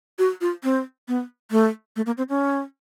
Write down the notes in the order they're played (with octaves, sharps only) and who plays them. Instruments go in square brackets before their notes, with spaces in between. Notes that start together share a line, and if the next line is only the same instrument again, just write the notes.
[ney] F#4
F4
C4
B3
A3
A3
A#3
C4
C#4